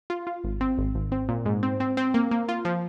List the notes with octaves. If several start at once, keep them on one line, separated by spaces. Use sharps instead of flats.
F4
F4
G#1
C4
G#1
G#1
C4
A#2
G#2
C4
C4
C4
A#3
A#3
F4
F3